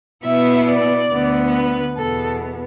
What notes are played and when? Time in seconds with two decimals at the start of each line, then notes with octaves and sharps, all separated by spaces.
0.24 B2 B3 E4 E5
0.67 D5
1.10 D2 D3 B3
1.52 B4
1.96 E2 B2 B3 A4